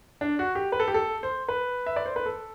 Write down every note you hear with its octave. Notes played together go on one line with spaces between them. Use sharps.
D4
F#4
G4
B4
A4
G4
A4
C5
B4
E5
D5
C5
B4
A4